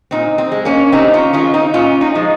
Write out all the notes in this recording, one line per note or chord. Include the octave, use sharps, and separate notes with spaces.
A#2 C4 D#4
C4
G#3
A#3 C#4
C3 C4 D#4
C#4 F4
D#3 G#3 C#4 F4
C4 D#4
A#2 C#4 F4
C4 D#4
F3 G#3